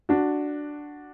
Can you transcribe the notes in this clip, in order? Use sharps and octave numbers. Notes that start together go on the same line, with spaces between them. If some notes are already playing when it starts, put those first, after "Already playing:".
D4 F#4